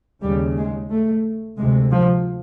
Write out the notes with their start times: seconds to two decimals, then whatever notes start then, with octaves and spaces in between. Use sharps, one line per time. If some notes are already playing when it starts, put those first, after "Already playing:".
0.22 D#2 C#3 G3
0.57 G#3
0.91 A3
1.58 D2 C3 G#3
1.92 F3